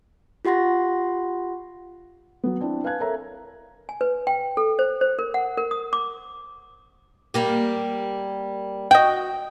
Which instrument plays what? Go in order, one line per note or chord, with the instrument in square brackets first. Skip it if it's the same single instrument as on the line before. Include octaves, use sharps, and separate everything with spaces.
[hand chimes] F4 G4 F#5 C6 A#6
[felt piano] F#3 B3
C4 D4 E4
B4 F5 G#5 A5 F#6 G#6
A4 A#4 C#5 E5 A#5
[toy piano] G#5
B4
G5
A4
C5
C5
A#4
F#5
A#4
D#6
D6
[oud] G3 A#3 G4
[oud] F#4 [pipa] D#5 G5